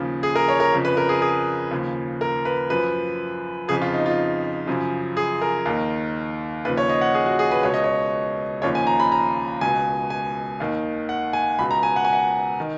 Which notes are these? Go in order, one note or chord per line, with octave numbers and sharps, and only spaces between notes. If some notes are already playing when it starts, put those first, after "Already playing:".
Already playing: D#2 C#3 F3
G#4
A#4
C#5
A#4
F2 C#3 F3
B4
A#4
G#4
G#4
D#2 C#3 F3
A#4
B4
F#2 F3 B4
F2 C#3 F3 G#4
F4
D#4
F4
F#2 C#3 F3
G#4
A#4
D#2 D#3
D#2 C#3 F3 B4
C#5
D#5
F#5
G#4
F#4
G#4
B4
C#2 B2 C#5
D#5
C#5
D#2 C#3 F3 C#5
G#5
A#5
B5
A#5
C#2 B2 G#5
G#5
D#2 D#3
F#5
G#5
C#2 B2 B5
A#5
G#5
F#5
G#5
F#5
D#3